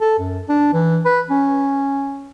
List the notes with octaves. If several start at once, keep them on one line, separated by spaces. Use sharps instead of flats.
A4
F#2
D4
E3
B4
C#4